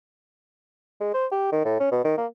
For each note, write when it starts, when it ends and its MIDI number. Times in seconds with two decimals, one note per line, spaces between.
1.01 1.13 56
1.14 1.26 72
1.31 1.48 67
1.52 1.64 51
1.64 1.77 45
1.80 1.89 61
1.91 2.02 47
2.04 2.16 51
2.18 2.26 58